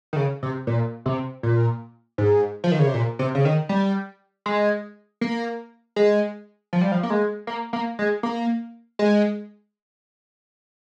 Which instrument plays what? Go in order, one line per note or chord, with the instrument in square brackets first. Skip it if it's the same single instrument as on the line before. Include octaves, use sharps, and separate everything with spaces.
[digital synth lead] D#3
C#3
C3
A#2
C3
A#2
G#2
F3
D#3
C#3
C3
A#2
C3
C#3
D#3
G3
G#3
A#3
G#3
F3
G3
F3
A#3
G#3
A#3
A#3
G#3
A#3
G#3